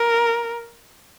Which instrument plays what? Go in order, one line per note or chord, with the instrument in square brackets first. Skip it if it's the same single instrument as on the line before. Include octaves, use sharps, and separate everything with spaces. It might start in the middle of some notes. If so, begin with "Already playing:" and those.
Already playing: [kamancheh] A#4